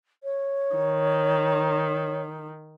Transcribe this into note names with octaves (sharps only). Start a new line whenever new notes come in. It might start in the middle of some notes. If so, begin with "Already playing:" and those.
C#5
D#3